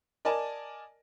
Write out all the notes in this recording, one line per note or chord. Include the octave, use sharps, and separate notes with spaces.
A#4 D5 D#5 G#5 A5